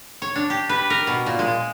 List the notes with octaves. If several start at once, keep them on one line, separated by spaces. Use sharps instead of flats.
C#5
D4
G4
B4
A#4
B2
A#2
G#3